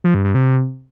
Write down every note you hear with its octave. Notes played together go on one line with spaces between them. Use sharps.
F3
G2
G2
C3